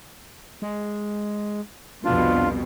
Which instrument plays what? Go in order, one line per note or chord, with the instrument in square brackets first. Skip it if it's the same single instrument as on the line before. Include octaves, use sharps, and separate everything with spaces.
[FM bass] G#3
[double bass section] C2 F2 [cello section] B2 [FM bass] D4 [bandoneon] F4